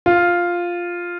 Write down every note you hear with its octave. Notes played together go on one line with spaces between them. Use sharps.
F4